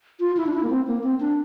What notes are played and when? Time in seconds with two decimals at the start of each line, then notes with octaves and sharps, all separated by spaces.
0.20 F4
0.37 E4
0.47 D4
0.54 E4
0.63 A#3
0.70 C4
0.87 A#3
1.03 C4
1.20 D4